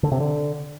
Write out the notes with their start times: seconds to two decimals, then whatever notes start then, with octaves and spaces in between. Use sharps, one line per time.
0.03 D3
0.12 C3
0.20 D3